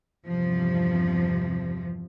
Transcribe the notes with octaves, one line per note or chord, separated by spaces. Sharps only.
E2 G2 C3 F3